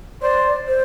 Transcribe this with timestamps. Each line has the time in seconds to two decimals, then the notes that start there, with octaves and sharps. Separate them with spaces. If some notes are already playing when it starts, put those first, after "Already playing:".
0.22 C5 D5
0.68 C5